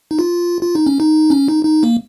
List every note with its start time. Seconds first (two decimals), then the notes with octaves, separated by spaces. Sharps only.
0.11 D#4
0.19 F4
0.63 F4
0.75 D#4
0.86 C#4
1.00 D#4
1.30 C#4
1.48 D#4
1.65 D#4
1.83 A#3